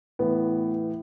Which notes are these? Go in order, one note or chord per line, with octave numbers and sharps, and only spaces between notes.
A2 E3 B3